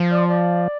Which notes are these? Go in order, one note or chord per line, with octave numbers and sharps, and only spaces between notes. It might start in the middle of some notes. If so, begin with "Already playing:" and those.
Already playing: F3
D5
D5